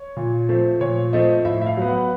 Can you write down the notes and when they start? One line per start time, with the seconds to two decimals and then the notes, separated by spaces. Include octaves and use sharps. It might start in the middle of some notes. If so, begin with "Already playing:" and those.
Already playing: C#5
0.16 A#2
0.49 F3 A3 C4
0.81 A#2 C#5
1.13 F3 A3 C4 D#5
1.45 A2 E5
1.62 E5
1.66 F5
1.77 F#3 B3
1.88 F#5